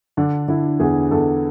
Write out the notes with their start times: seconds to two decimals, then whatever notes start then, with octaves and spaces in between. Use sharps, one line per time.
0.17 D3 D4
0.48 D3 E4
0.80 E2 G#4
1.11 E2 A4